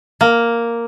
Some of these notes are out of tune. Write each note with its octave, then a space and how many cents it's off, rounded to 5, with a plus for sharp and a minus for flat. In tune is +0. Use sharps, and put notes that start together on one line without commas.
A#3 +0